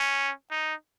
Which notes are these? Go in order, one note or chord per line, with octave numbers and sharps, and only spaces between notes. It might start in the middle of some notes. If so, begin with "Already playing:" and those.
Already playing: C#4
D#4